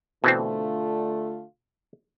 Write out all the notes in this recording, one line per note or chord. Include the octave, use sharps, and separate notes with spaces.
B2 D3 E3 A3 C4 F4